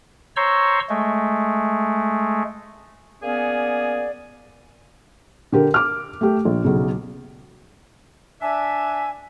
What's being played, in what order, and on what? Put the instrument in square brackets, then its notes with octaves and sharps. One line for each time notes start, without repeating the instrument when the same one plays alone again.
[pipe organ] C5 C#5 A#5 C6 C#6 E6
G#3 A3
[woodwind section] A#3 B3 C#4 G#4 D5
[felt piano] D3 G4 A#4
D6 F6
A3 G4
A#1
B1 C#3
[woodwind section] D4 E5 [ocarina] G#5